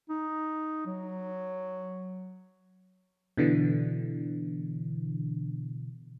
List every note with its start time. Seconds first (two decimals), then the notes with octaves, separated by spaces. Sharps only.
0.09 D#4
0.86 F#3
3.37 B2 D3 E3